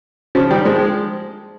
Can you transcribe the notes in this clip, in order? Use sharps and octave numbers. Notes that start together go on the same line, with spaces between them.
C#3 F3
D#3 G3
F3 G#3